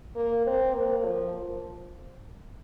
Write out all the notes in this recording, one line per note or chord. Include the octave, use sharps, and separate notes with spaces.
A#3
C4
A#3
F3